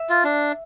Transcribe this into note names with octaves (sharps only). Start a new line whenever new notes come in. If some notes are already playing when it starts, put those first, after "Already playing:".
Already playing: E5
F4
D4